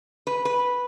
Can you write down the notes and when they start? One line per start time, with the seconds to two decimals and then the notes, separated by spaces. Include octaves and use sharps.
0.27 B4
0.45 B4